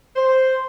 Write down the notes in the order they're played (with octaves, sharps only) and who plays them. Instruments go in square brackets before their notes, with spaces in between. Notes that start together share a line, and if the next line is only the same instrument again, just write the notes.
[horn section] C5